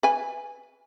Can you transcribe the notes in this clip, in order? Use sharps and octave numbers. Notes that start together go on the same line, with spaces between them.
B4 G#5